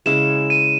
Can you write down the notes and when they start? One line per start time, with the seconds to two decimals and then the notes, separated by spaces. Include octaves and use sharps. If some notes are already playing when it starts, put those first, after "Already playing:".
0.06 C#3 G#3 C#4 E4 E7
0.50 D#7